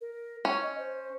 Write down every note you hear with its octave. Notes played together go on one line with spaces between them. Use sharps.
A#4
C#4 C#6
D#5
C5